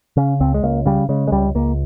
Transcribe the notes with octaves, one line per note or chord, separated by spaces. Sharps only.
C#3 C#4
C#2 C4
G#3
C#2 A#3
C#3 G3
C#3 G#3
G#3
C#2 G3
C#2 A#3